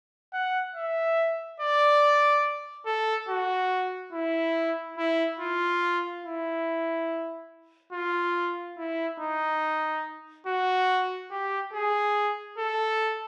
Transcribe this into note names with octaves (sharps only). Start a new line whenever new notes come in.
F#5
E5
D5
A4
F#4
E4
E4
F4
E4
F4
E4
D#4
F#4
G4
G#4
A4